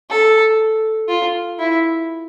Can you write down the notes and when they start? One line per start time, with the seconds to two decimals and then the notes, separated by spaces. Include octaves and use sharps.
0.10 A4
1.09 F4
1.59 E4